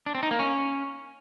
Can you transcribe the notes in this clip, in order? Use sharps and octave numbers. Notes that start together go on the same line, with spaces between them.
D4
C4
D#4
A#3
C#4